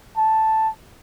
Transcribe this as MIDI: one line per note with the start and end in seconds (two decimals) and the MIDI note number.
0.17 0.69 81